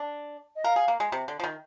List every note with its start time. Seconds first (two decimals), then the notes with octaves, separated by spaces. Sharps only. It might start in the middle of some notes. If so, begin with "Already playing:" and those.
Already playing: D4
0.56 D#5
0.64 A#4 F5
0.76 G#4
0.88 A#3
1.00 G#3
1.12 C3
1.28 D3
1.40 F3
1.44 D#3